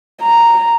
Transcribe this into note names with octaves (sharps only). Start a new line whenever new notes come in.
A#5